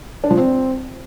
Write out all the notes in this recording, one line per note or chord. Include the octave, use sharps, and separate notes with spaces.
D4
F3
C4